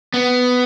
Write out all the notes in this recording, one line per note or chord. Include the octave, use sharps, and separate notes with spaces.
B3